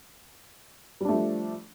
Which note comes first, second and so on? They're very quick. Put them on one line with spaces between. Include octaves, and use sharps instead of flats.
G3 D4 A3 F3